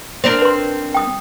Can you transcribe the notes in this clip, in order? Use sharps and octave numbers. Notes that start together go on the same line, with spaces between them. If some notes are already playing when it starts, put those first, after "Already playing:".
C4 D4 A#4
B4 C6
G5 D#6